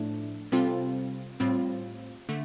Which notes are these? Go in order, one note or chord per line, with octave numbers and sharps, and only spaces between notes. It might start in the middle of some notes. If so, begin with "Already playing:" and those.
Already playing: A2 F3 A3 D4
C3 G3 C4 F4 A4
A2 G3 C4 F4
D3 A3